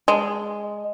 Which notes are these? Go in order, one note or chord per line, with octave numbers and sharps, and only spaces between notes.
G#3